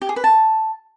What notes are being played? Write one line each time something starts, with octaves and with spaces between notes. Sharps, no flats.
G4
G#4
B4
A5